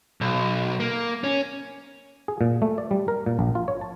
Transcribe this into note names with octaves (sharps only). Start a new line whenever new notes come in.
B1
A#3
C#4
G#4
A#2
A3
D5
G3
A#4
A#2
A#1
F4
C#5
A5